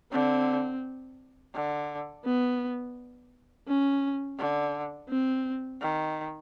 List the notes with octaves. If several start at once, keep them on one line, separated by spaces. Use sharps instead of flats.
D3 C4
D3
B3
C#4
D3
C4
D#3